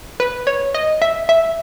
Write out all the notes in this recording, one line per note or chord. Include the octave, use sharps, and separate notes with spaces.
B4
C#5
D#5
E5
E5